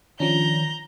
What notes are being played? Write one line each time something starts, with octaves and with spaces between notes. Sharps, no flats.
D#3 F3 C#4 D4 A#5 G6